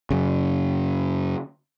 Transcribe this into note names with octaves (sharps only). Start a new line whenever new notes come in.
F#2 C#3